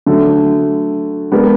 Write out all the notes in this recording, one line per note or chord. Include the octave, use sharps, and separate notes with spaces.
D3 F#3 A3
G#3 B3 D4 G4 A#4